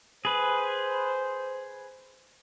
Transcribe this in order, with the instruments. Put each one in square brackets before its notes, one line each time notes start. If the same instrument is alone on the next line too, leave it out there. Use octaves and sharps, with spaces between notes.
[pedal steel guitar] G#4 B4 [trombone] C5